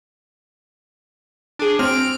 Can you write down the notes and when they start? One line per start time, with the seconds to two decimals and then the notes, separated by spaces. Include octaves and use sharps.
1.59 D4 G#4
1.79 C4 F6 D7